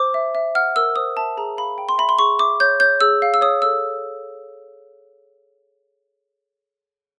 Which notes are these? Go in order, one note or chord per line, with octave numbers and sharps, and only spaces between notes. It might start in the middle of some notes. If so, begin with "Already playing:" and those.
Already playing: C5 D6
E5
E5
F#5 F6
A#4 E6
C5 D#6
E5 A5
G#4 A#5
F5 B5
G5
C6
E5 B5
C6
G#4 C#6
E5 D6
C#5 G6
C#5 G6
G#4 E6
F5
E6
C#5 D#6
A4 E6